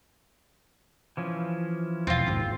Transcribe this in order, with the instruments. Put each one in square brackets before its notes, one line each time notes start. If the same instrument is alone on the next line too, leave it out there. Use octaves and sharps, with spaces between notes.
[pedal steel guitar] E3 F3 C#4
[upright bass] E1 [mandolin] C4 F4
[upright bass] G#1 D#2